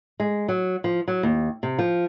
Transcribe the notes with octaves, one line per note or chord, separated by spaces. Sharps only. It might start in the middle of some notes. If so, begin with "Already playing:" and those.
G#3
F#3
F3
F#3
D#2
C3
F3